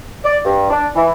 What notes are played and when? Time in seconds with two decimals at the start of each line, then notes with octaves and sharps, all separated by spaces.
0.24 D5
0.45 G2
0.70 D4
0.96 E3